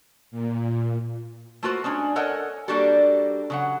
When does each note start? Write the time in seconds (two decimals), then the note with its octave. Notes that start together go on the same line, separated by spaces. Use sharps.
0.31 A#2
1.63 A3 A#3 F4 F#4 B4 C5
1.84 G#3 C#4 D4
2.16 A4 A#4 C#5 D#5 F#5 G#5
2.68 G3 A#3 D4 F#4 G4 A4
3.50 C#3 F#3 F#5